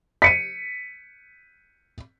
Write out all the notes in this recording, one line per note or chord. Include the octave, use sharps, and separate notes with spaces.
B6 C#7 D#7